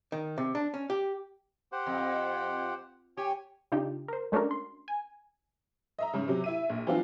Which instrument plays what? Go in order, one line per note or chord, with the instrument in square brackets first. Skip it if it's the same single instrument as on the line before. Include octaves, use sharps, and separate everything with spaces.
[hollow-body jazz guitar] D#3
C3
D4
C#4
G4
[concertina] G4 C5 F#5
[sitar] F2
[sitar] G4 [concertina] C#5 G#5
[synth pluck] C#3 D4 D#4 F4 G4
A#4 C5
G#3 A3 C#4 D4 F#4 A#4
C6
G#5
[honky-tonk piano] D#5 E5 A#5
G#2 C#3
C3 F#3
E4 E5 D#7
A#1
E3 F#3 B3 C4 D4 F4